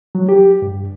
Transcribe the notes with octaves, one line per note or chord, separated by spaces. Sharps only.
F#3
G4
G2